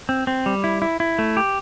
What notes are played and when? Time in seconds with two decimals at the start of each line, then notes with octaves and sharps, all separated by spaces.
0.09 C4
0.27 C4
0.46 G3
0.64 E4
0.82 E4
1.00 E4
1.19 A3
1.37 G4